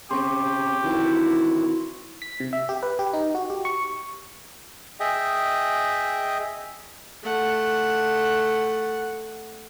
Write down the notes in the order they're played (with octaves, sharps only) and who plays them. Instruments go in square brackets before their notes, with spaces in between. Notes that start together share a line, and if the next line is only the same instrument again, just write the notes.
[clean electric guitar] C#3 C4 [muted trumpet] G4 [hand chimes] C6 C#6
[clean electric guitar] D#3 E3 C4 [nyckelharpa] E4 F#4
[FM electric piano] B6
C3
E5
G4
B4
G4
D#4
F#4
G4
C#6
[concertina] G#4 D#5 E5 G5
[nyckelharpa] A3 F#5